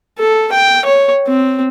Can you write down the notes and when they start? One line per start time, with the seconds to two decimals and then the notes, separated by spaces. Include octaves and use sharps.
0.19 A4
0.52 G5
0.85 C#5
1.27 C4